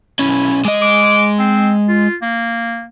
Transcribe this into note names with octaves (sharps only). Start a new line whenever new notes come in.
B1 C#4 E4
G#3 D#5 D6
D6
C4
F4
A#3